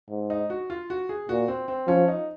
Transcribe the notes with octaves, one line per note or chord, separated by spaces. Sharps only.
G#2
D#4
F#4
F4
F#4
G#4
A#2 F#4
C4
C4
F3 C#4
D#4